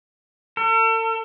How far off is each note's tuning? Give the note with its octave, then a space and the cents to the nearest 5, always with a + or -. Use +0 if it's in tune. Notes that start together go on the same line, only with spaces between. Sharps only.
A4 +40